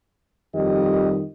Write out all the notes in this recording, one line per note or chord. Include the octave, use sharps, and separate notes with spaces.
F2 D#3 G3 G4 D#5